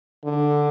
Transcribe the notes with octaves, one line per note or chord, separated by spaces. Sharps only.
D3